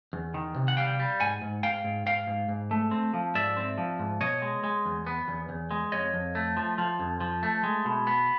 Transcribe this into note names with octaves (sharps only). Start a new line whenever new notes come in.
E2
D#3
C3
F#5
G3 F5 G5
G3
G#2 F#5 G#5
G#2
G#2 F5 G5
G#2
G#2 F5 G5
G#2
G#2
A3
C4
F3
G#2 D5 E5
C4
F3
G#2
B2 C#5 D#5
G#3
G#3
E2
B3
E2
E2
G#3
F2 C#5 D#5
F2
A3
F3
F3
F2
F3
A3
G#3
B2
B3